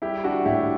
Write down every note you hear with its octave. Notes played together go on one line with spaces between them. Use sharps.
G3 E4 G4
G3 D4 F#4
A2 E4 G4